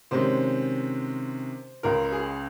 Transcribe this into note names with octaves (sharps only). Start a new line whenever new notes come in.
C3 D#3 G#3 C#4 C5
C#2 C#3 G#3 A#4
G#4